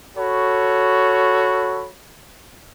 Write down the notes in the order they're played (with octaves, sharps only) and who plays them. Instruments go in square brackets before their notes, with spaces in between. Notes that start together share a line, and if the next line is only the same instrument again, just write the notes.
[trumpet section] F#4 A4 C#5 B5